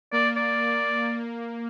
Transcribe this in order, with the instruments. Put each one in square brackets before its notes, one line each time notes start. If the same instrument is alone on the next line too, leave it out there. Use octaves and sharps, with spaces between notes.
[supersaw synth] A#3 [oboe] D5
[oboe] D5